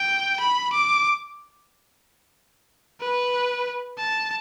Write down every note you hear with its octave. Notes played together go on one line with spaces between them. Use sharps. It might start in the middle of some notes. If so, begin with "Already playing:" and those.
Already playing: G5
B5
D6
B4
A5